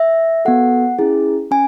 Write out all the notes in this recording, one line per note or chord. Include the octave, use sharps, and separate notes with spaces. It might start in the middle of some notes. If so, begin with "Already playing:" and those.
Already playing: E5
B3 F#4 A4 F#5
C#4 E4 G#4
C#4 G#5